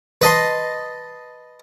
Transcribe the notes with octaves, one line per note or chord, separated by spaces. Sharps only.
B4 D#5 A5 C6